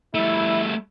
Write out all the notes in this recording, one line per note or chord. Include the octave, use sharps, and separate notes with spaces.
G3 A3 E4